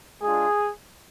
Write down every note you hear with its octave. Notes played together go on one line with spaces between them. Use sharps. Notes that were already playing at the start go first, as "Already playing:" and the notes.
G#3 D4 F4 G#4